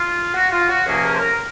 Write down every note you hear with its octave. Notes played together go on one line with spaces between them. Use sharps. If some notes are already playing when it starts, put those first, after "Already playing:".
Already playing: F4
F#4
F4
F#4
C#2 C3 F3 A#3 C#4 G#4
A#4
C5
A#4